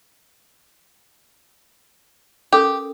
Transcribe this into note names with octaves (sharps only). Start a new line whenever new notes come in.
C#4 G4 A4 A#4